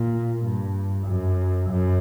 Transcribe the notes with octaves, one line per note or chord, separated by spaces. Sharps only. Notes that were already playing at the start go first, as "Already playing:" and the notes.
Already playing: A#2
G2
F#2
F#2